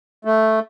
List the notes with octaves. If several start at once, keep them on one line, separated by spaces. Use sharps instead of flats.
A3